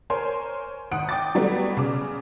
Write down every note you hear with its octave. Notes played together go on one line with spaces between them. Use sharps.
A#4 C5 C#5 G#5 C6
G#1 F#5 D#6 D7
G5 D6 A6
F#3 G3 A3 B3
C#3 D6